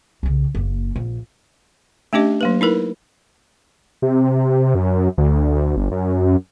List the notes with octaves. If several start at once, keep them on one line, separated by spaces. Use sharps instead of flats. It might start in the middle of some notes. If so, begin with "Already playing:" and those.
C2 C#3
F#1 A#3
A#1
A3 C#4 D4 G4 D#5
F#3 A#3 B4
D#4 E4 A#4 B4
C3
F#2
D2
G1
F#2